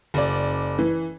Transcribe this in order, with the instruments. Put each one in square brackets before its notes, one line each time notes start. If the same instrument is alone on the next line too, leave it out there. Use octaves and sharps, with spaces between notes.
[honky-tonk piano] F#1 D5
E3